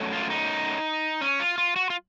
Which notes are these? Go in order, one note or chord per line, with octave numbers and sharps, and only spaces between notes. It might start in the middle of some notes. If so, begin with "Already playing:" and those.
Already playing: F#2 F#3 A3
F4
D#4
C#4
F4
F4
F#4
F4